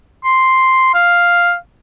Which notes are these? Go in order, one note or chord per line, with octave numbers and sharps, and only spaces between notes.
C6
F5